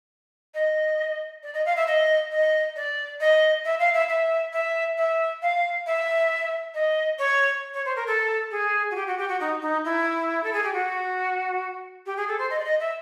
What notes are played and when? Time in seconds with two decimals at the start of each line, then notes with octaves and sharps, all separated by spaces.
0.54 D#5
1.43 D5
1.54 D#5
1.65 F5
1.76 E5
1.87 D#5
2.31 D#5
2.76 D5
3.20 D#5
3.65 E5
3.79 F5
3.93 E5
4.09 E5
4.53 E5
4.97 E5
5.42 F5
5.86 E5
6.74 D#5
7.18 C#5
7.74 C#5
7.85 C5
7.96 A#4
8.07 A4
8.51 G#4
8.91 F#4
8.96 G4
9.07 F#4
9.18 G4
9.28 F#4
9.40 D#4
9.62 D#4
9.85 E4
10.43 A4
10.53 G#4
10.63 G4
10.73 F#4
12.06 G4
12.17 G#4
12.28 A4
12.38 C5
12.50 D#5
12.59 D5
12.65 D#5
12.80 E5